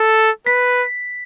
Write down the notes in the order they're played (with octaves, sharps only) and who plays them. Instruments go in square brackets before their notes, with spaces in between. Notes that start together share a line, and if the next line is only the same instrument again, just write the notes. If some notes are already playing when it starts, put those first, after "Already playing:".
Already playing: [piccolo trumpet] A4
[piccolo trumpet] B4 [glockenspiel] B6